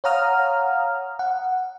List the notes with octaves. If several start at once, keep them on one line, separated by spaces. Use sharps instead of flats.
C#5 F5 F#5 A#5 D#6 F6
F#5